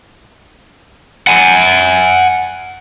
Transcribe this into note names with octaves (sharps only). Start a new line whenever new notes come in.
F#5 G#5